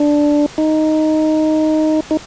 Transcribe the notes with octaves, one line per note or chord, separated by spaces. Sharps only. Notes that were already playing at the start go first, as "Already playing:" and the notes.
Already playing: D4
D#4
D#4